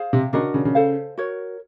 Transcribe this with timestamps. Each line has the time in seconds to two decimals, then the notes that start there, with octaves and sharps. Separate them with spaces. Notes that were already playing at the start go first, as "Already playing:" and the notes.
Already playing: G#4 C5 F5
0.13 C3
0.33 C#3 D4 F#4 A#4 D#5
0.54 C#3
0.65 C#3
0.75 A4 C5 F5
1.18 F#4 A#4 C#5